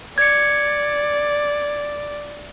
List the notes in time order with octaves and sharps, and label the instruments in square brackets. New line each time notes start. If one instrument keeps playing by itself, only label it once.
[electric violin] D5 [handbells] G#6 C#7